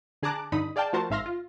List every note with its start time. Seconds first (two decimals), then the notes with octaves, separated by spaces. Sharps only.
0.22 D3 G#4 A5 A#5 D6 F#6
0.52 G2 D3 D#4 B5 D#6
0.76 G#4 D5 F5 G5 A5
0.93 F3 A3 F#4 A#4 C5 A5
1.10 G#1 G#2 E5 F5 C6 A#6
1.26 F4